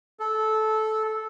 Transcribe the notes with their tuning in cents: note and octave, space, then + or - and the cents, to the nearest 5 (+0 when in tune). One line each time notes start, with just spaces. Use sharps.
A4 -15